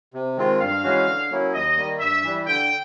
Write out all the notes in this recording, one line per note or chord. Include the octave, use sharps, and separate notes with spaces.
C3
D#3 G#3 C4 F4
G2 F5
E3 G#3 C#4 F#4
D3
F#3 A#3 C#4 E4
D#2 D#5
D#3 G3 A#3
G2 E5
E3 G3
D3 G5